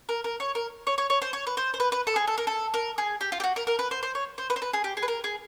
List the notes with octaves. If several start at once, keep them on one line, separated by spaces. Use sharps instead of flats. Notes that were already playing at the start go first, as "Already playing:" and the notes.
A#4
A#4
C#5
A#4
C#5
C#5
C#5
C5
C#5
B4
C5
C5
B4
B4
A4
G#4
A4
A#4
A4
A#4
G#4
G4
F4
G4
F#4
A#4
A#4
B4
C5
C5
C#5
C5
B4
C5
B4
G#4
G4
G#4
B4
A#4
G#4